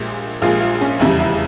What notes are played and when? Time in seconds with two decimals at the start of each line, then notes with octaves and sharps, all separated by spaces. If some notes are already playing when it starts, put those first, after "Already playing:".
Already playing: A#1 A#2 G#3 G4
0.42 A#1 A#2 G#3 F4
0.61 F4
0.81 C#4
1.00 F1 E2 C#3 G3 E4
1.20 E4